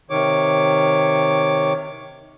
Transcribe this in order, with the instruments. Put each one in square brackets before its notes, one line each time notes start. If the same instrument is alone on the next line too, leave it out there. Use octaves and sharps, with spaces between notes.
[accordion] C3 D#3 C#5 D6